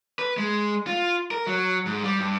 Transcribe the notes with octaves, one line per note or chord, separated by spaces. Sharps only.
B4
G#3
F4
A#4
F#3
G#2
G3
G2